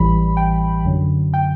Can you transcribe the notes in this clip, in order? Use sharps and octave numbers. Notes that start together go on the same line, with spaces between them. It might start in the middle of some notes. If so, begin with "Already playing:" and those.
Already playing: A1 A2 E3 G3 B5
G5
F#2 D3 F#3
G5